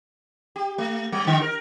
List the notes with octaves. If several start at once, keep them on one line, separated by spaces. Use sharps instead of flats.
G4
A3
G3
D3
A#4